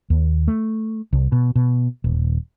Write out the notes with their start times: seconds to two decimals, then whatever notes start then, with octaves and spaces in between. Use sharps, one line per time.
0.10 D#2
0.48 A3
1.13 C2
1.32 B2
1.55 B2
2.04 D#1